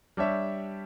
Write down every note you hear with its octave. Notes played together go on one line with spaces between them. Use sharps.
G3 D4 G4 C#5 E5